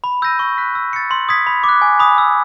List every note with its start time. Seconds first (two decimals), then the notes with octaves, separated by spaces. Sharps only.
0.04 B5
0.22 E6 G6 A#6 D#7
0.39 C#6
0.58 F#6 B6
0.75 E6
0.93 A6 C#7
1.11 C6
1.29 D#6 G#6 B6
1.47 B5
1.64 D6
1.69 F#6
1.82 G#5
1.99 B5 D#6
2.18 E6